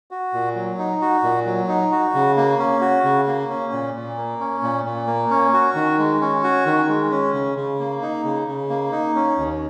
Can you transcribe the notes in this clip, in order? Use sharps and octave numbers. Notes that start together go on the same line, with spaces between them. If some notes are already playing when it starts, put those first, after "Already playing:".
F#4
A#2
F#3
D#4
F#4
A#2
F#3
D#4
F#4
C#3
A#3
C#4
F#4
C#3
A#3
C#4
A#2
A#2
A#3
C#4
A#2
A#2
A#3
C#4
F#4
D#3
G#3
C#4
F#4
D#3
G#3
C#4
C#3
C#3
A#3
D#4
C#3
C#3
A#3
D#4
C#4
D#2